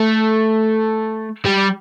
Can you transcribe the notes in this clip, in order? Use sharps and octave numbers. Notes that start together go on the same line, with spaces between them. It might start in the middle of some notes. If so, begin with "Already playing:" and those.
Already playing: A3
G3